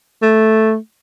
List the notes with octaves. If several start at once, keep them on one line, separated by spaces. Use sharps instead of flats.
A3